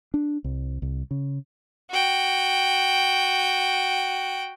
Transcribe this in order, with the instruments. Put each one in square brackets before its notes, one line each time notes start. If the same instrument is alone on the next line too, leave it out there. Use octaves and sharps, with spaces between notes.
[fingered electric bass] D4
C2
C2
C#3
[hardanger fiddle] F#4 G5